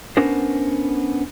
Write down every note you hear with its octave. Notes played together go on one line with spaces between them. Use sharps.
B3 C#4 D4 A#4 C5